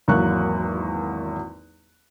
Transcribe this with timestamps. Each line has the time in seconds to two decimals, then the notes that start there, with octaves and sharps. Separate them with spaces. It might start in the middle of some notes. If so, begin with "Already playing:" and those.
0.08 G#1 E2 F#3 A#3 C#6 F#6